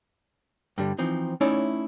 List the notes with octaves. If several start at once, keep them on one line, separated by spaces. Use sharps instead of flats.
G2 D3 G3
E3 F3 C4 D#4
A3 C#4 D#4 E4 C#5 D5